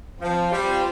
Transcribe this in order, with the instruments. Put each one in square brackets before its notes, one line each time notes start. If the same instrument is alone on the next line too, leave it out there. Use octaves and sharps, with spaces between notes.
[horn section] F3 [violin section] C4 F4 C5
[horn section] G3